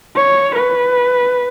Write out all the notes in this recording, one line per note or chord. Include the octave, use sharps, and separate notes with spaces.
C#5
B4